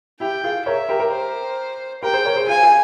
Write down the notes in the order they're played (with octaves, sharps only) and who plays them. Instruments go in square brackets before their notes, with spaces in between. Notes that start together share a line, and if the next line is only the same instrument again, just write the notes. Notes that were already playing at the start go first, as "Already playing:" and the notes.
[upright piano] E4 G4 [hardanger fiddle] G5
[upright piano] F4 G#4
[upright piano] A#4 C#5 [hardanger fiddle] E5
[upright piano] G4 A#4
G4 A#4
[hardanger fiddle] C5
[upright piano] G4 A#4 [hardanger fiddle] G5
[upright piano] G#4 C5
A#4 C#5
G#4 C5
[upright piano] F4 G#4 [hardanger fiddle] G#5
[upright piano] F4 G#4